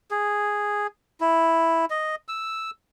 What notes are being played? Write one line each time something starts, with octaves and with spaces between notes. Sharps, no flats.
G#4
E4
D#5
E6